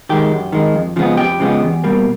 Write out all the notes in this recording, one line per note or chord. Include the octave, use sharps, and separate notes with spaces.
D#3 G#3 G4
F#2
D#3 G#3
F2
C#3 F3 G#3 B3
F2 G4
C#3 F3 G#3 B3
E2
B2 G3 A#3